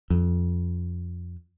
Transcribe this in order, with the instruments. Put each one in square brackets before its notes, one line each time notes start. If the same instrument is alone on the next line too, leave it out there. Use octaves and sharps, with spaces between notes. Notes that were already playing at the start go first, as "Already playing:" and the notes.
[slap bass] F2